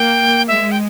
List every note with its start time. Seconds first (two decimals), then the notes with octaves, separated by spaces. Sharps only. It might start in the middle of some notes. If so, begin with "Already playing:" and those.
Already playing: A#3 G5
0.48 G#3 E5
0.72 G5